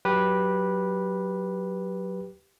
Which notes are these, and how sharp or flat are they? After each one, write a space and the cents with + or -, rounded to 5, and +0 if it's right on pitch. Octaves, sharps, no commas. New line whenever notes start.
F#3 +0 G4 +0 B4 -10